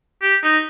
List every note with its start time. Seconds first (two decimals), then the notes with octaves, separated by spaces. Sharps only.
0.22 G4
0.43 D#4